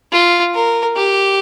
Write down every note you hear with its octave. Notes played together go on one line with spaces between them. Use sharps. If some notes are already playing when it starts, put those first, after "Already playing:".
F4
A#4
G4